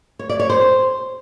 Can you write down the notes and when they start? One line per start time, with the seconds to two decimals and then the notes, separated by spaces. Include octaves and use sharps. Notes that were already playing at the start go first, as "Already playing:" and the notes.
0.19 C#5
0.29 D5
0.39 C#5
0.50 C5